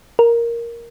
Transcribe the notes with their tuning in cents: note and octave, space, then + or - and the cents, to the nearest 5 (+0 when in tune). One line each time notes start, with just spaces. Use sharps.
A#4 +5